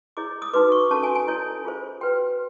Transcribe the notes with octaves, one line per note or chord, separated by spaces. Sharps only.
E4 G#4 C#5 D6
D#6
D#4 F#4 B4 D6
C#6
C#4 F#4 A4 A5
G#5
G#5
E4 A4 C#5
F4 G#4 C5
F#4 B4 G5